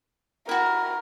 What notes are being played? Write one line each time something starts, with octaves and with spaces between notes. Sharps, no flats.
E4 F#4 A#4